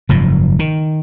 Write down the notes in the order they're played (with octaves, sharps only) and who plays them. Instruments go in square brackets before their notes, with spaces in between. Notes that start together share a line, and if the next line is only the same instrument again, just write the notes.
[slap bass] F#1 G#2 F3
D#3